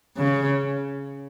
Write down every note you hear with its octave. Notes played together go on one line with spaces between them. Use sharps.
C#3